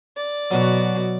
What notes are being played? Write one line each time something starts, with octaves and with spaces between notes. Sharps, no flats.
D5
B2 F#3 F#4